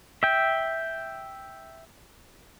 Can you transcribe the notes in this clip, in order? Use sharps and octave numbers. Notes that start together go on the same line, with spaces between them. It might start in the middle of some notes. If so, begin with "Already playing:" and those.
E5 G5